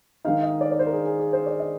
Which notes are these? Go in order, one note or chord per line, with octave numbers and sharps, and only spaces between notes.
D#3 G#3 D#4 F5
D#5
D5
D5
C5
A#4
G#4
G#4
G#4
C5
D5
D#5